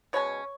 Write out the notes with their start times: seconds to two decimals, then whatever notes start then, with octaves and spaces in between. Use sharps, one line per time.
0.13 B2 G#3 C#4 C#5